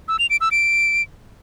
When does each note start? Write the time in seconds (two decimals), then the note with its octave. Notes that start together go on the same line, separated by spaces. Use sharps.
0.08 E6
0.19 F7
0.30 D7
0.41 E6
0.52 D7